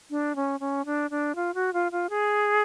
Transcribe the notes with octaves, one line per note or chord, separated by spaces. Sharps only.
D4
C#4
C#4
D4
D4
F4
F#4
F4
F4
G#4